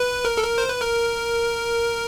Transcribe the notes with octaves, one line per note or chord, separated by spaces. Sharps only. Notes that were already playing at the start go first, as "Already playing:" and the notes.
Already playing: B4
A#4
A4
A#4
C5
B4
A#4